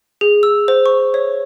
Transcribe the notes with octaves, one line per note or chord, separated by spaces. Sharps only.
G#4
E6
C5
C#6
C#5